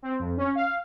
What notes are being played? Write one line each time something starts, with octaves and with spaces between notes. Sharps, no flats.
C4
F2
C#4
F5